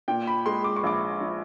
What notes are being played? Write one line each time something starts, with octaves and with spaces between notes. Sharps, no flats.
A#2 G5
B5
G#3 C6
D6
C#6
A#1 D6
F3